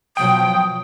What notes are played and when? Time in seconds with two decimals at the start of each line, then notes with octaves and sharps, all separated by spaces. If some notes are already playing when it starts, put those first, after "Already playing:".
0.17 B2 F3 F#3 G5 D#6